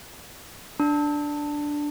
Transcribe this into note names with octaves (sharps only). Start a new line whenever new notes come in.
D4